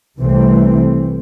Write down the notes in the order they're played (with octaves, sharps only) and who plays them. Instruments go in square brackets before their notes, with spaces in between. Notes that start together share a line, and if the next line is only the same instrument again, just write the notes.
[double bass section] C2 C3 E3 A3 C4